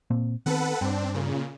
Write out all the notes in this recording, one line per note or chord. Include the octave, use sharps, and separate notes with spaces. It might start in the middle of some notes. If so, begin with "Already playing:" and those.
A#2 A#3 C4
D#3 B3 C4 A4 B4 F#5
G2 C4 D4
A#2 C#3